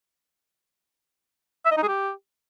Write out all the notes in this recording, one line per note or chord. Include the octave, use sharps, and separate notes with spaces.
E5
D#5
D#4
G#4
G4